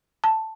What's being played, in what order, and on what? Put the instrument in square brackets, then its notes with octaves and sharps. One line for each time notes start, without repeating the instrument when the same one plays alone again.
[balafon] A5